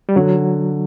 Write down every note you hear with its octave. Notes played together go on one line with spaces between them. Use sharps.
G3
D3 F#3